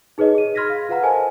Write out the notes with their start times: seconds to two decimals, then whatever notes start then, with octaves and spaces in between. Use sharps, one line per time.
0.18 D#4 G#4 B4 C#5 D#5
0.35 G#4 D#7
0.55 B5 C6 F6 G#6 A#6 B6
0.70 F5
0.89 F4 B4 F5 F#5 A#5 F6
1.02 A4 A#4 C5 D#5 G#5 A5